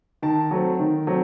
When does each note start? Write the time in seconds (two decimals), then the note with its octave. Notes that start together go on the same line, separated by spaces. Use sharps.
0.22 D#3 A5
0.51 F#3 A3 C4
0.79 D#3
1.07 F#3 A3 C4